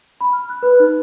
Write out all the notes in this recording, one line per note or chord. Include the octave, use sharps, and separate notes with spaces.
B5
F6
F#6
B4
D#4